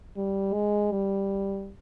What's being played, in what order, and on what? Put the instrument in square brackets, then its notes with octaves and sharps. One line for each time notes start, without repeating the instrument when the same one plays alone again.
[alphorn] G3
G#3
G3